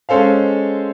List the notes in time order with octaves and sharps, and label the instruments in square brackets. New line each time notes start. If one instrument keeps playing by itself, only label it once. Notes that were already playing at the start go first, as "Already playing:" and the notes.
[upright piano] G#3 C#4 A4 C5 F5